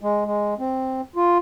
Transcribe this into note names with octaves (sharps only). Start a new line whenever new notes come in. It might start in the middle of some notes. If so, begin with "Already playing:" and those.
G#3
G#3
C4
F4